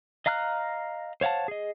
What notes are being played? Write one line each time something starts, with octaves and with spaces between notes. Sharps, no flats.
D#5 F5 A#5 F6 F#6
C5 C#5 F5 F#5 A5
G#4 D#5